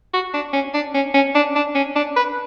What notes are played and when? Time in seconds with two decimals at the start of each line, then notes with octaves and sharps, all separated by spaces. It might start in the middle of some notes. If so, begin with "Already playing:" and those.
0.13 F#4
0.34 D4
0.53 C#4
0.74 D4
0.94 C#4
1.14 C#4
1.35 D4
1.55 D4
1.75 C#4
1.96 D4
2.16 B4